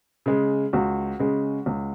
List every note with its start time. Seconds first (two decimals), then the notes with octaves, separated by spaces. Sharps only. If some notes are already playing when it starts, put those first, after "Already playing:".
0.26 C#3 G#3
0.73 C#2 F#4
1.19 C#3 G#3
1.66 C#2